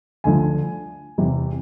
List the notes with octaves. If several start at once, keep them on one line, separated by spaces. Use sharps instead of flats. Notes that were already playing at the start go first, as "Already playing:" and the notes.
D2 D3 F3 G#5
E2 C3 E3